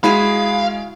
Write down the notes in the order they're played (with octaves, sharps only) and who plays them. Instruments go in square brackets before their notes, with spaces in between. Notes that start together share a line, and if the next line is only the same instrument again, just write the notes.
[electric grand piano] G#3 [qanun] E4 F#4 G#4 [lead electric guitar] F5 [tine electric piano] B5